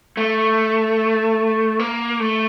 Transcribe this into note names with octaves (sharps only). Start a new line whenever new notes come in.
A3
A#3
A3